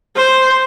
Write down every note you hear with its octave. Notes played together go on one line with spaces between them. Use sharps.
C5